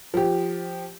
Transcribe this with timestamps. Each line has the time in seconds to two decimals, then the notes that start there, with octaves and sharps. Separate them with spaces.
0.14 F3 G4